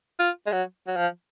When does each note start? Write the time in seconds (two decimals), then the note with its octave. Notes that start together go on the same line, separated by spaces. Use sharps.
0.19 F4
0.47 G#3
0.52 F#3
0.87 F#3
0.96 F3